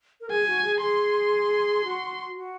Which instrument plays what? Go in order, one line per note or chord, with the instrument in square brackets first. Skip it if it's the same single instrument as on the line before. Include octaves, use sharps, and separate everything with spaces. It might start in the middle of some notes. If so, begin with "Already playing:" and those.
[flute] A#4
[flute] G#4 [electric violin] G#5
[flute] F#4
G#4
[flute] G#4 [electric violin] C6
[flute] F#4
F#4